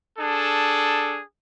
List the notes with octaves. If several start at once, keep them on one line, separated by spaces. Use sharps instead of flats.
D4 G#4 A4